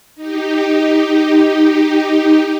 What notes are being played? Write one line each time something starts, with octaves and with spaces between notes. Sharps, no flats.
D#4 G4